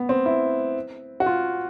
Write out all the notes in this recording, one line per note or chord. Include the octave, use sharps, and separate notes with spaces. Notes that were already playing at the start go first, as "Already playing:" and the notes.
Already playing: B3
C4
E4
F#4
F4